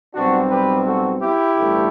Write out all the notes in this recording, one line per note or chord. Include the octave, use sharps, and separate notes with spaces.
B1 B2 G3 C4 D4 F#4
G4 B4
F#4 A4
E4 G4
A1 G2 D3 A3